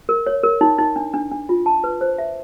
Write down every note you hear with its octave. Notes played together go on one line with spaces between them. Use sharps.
A#4
C#5
A#4
D#4
D#4
D4
D4
D4
F4
A5
B4
C5
E5